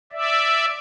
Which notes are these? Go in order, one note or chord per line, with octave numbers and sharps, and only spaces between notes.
D5 E5